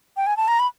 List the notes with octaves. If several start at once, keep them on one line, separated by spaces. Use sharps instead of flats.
G5
G#5
A5
A#5
B5